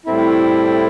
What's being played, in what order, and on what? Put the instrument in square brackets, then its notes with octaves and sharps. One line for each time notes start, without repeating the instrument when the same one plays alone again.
[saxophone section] A2 G3 C4 E4 [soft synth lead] A4